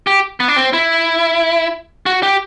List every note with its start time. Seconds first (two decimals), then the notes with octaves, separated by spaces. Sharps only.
0.07 G4
0.40 B3
0.48 D4
0.56 C4
0.73 E4
2.06 F#4
2.23 G4